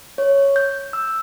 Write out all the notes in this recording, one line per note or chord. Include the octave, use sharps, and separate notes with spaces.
C#5
G6
E6